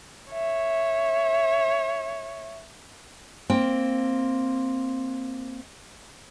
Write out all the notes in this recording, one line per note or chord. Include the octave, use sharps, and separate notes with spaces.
C#5 E5
A#3 C4 G5